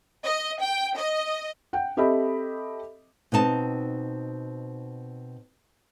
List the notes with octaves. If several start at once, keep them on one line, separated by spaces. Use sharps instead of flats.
D#5
G5
D#5
F#5 G5
C4 G4 A4 D#5 E5 B5
B2 C4 D#4 A5